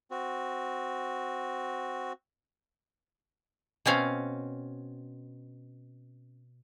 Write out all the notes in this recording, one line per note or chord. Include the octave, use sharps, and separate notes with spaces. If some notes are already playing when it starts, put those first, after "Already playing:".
C4 F#4
B2 C4 C#4 F5